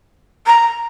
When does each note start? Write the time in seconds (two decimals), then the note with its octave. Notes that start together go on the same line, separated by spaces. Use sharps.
0.47 A#5